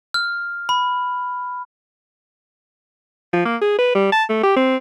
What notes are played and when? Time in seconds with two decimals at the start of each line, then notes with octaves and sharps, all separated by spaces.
0.14 F6
0.69 B5
3.33 F3
3.45 A#3
3.62 G#4
3.79 B4
3.95 G3
4.12 A5
4.29 A3
4.43 G4
4.57 C4